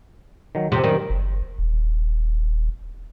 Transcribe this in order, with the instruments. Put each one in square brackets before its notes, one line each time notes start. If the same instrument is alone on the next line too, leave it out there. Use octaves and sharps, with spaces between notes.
[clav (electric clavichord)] D#3 F#3
[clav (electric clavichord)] F2 C5 G5 [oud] C3
[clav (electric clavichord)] F#2 G3 [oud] D#3
[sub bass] F#1
D#1